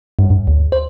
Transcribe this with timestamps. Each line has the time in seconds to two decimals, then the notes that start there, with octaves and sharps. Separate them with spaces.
0.19 G2
0.30 G2
0.47 D2
0.72 C5